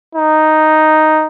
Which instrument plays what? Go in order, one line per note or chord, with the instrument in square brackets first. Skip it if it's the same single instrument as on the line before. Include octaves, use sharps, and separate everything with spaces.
[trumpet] D#4